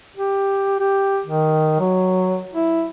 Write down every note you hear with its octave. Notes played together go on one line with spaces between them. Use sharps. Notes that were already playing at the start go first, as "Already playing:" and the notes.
G4
G4
D#3
F#3
E4